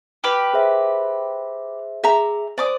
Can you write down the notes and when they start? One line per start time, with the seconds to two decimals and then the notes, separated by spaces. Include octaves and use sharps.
0.24 G4 B4 F6
0.54 G#4 C5 E5
2.04 G#4 E5 A#5
2.58 C5 D5 D6 D#6